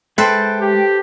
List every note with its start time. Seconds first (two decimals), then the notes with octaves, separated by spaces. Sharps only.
0.18 G#3 G#4 A4 B4 C5 E5 G5
0.61 G4